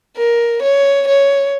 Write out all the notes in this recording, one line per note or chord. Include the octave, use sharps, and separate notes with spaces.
A#4
C#5
C#5